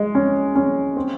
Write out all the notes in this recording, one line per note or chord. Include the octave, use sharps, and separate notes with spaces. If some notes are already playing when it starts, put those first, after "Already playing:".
Already playing: G#3
C#4
C#4
C4